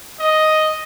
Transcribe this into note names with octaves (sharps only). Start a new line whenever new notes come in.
D#5